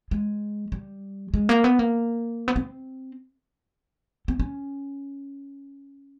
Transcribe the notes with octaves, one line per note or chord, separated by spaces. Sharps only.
G#3
G3
G#3
A#3
B3
A#3
B3
C4
C4
C#4